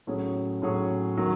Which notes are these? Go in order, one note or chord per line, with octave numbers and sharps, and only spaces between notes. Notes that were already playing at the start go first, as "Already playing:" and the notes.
A2 F#3 C#4 G#4 C#5
A2 F#3 C#4 G#4 C#5
D#3 F#3